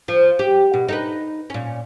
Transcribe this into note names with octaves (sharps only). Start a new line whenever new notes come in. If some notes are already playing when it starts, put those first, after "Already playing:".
F3
G4
B2
D#4 A4 B4
A#2 C#4